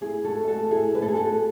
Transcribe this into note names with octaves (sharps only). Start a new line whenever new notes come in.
A3 E4 G#4
F#4 A4
A3 F#4 A4
E4 G#4
A3 B4
A4
G#4
F#4 A4